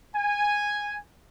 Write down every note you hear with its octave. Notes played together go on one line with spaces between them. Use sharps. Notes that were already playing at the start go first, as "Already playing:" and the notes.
G#5